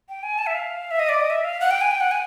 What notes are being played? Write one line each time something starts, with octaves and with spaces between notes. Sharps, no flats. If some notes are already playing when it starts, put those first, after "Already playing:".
G5
G#5
A5
E5
F5
E5
D#5
D5
D#5
E5
F5
F#5
G5
G#5
G5
F#5
G#5